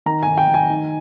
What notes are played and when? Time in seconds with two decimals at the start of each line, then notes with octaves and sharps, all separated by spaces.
0.06 D#3 A#5
0.23 D#3 G#5
0.38 G5
0.48 D#3
0.54 G#5
0.70 D#4